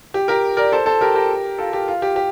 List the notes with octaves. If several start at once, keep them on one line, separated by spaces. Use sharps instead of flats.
G4
G4 A#4
A#4 D5
A4 C5
A4 C5
G4 A#4
G4 A#4
F4 A4
G4
F4
G4
G4